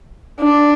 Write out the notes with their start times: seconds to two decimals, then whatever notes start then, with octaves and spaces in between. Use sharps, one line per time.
0.41 D4